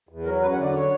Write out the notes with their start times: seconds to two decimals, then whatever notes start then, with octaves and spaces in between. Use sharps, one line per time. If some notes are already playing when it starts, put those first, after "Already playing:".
0.09 E2
0.25 F#3 A#4
0.41 F#2 B4
0.52 F#5
0.57 D3
0.63 D5
0.74 C#5